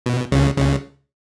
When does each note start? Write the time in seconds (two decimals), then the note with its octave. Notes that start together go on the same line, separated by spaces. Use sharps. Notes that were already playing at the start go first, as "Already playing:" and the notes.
0.06 B2
0.32 C#2 C#3
0.58 C#2 C#3